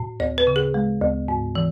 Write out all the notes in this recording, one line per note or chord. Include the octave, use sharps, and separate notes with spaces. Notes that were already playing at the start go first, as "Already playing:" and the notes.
Already playing: A2
D2 C#5
B4
C#3
G#4
G#3
D2
G#2
E3